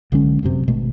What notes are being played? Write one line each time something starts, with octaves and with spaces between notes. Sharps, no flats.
B1 D3 G#3 C#4
F1 F#2 C3
G#1 B2 D#3 A3